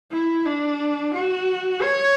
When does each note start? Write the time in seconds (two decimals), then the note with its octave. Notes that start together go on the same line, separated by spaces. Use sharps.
0.12 E4
0.46 D4
1.14 F#4
1.82 C#5